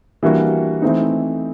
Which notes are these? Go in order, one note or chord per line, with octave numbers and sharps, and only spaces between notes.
E3 G3 A#3 D4 F#4
E3 A3 C4 D#4